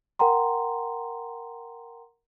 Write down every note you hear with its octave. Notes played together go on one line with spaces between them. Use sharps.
A#4 F#5 G5 A#5 C6